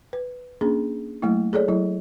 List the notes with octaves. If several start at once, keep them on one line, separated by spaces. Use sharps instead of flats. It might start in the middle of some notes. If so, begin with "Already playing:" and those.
B4
A#3 C#4 D4 G#4
F#3 A3 A#3 E4
G#4 A4 C#5 D5
F#3 E4